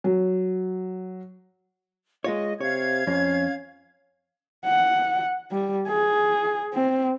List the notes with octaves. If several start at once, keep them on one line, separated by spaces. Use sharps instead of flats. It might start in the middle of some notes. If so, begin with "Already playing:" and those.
F#3
G#3 F4 C#5 D#5
C3 C#5 F5 G#6
F2 C#4
F#5
G3
G#4
C4